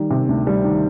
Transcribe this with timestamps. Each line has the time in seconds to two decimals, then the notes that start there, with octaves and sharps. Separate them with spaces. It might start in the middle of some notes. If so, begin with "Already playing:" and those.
Already playing: D#3 G3
0.10 C3
0.29 D2
0.47 G3
0.64 D#3